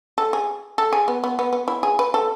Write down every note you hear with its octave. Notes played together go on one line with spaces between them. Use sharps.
A4
G#4
A4
G#4
B3
B3
B3
B3
E4
G#4
B4
A4